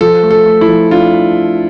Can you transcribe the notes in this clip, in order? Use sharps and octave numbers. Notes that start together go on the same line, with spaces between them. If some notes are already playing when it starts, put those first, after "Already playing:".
F3 A4
A3
A4
A3
E4
F3
D4 F4